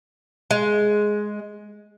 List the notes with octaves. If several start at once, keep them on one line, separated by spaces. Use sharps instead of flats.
G#3